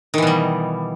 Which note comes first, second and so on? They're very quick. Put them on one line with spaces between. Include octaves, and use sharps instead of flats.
D#3 E3 B2 G3